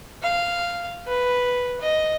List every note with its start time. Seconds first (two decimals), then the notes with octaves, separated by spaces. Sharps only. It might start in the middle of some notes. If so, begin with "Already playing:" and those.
0.22 F5
1.08 B4
1.81 D#5